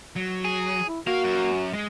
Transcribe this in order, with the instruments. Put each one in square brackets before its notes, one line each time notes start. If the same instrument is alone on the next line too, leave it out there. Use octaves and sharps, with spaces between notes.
[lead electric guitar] F#3
[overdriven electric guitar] G#4
[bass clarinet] E4
[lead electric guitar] A#3 [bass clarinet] F#4 [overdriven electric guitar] F5
[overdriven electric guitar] F#2
[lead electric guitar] G#3